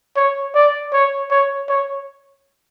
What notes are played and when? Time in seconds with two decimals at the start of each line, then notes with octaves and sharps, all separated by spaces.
0.16 C#5
0.55 D5
0.93 C#5
1.31 C#5
1.69 C#5